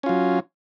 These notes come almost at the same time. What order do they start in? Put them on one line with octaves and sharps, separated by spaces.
C#4 F4 F#3